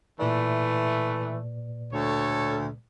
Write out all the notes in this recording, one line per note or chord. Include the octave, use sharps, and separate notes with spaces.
A#2 E3 A3 B4 D5
D2 A4 C#5